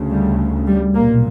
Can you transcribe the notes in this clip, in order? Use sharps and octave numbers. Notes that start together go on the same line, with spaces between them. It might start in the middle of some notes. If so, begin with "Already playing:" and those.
Already playing: D2 C#3
G3
G3
B1 A#2 A#3